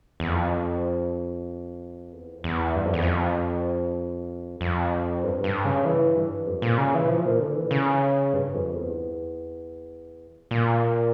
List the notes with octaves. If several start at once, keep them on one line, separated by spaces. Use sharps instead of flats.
E2
F2
E2
F2
E2
G2
F2
E2
F2
F2
G2
G2
C#3
E3
G2
F2
A#2
C#3
E3
F3
A#2
D3
E3
C#3
G2
F2
E2
A#2